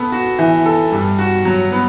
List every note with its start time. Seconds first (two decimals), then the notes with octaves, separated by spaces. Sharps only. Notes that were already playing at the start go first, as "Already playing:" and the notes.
Already playing: B3 A4
0.12 F#4
0.39 E3
0.66 A4
0.92 G2
1.19 F#4
1.45 F#3
1.72 B3